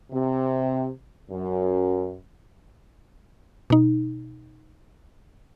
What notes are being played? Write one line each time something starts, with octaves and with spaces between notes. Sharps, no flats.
C3
F#2
B2 D#4